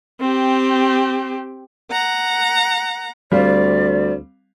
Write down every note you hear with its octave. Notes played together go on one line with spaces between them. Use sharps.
C4 G4
F#5 A#5
D2 G3 C4 D5 F5